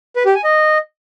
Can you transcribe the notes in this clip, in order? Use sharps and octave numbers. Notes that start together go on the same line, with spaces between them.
B4
G4
G#5
D#5